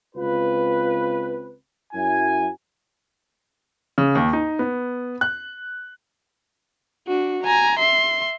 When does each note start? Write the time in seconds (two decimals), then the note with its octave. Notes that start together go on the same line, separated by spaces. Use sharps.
0.16 C#2 C4 F4 B4
1.94 F#2 F#3 E4 G#5
3.98 C#3
4.15 D#2
4.33 D#4
4.59 B3
5.21 F#6
7.07 D4 F#4
7.43 G#5 A#5
7.79 E5 C6